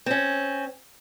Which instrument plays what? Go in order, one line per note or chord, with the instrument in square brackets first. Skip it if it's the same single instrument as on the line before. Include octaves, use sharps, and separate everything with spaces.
[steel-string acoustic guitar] C4 C#4